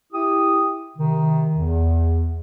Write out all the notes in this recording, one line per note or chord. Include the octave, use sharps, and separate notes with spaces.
E4 G4 D#6
C3 D#3
E2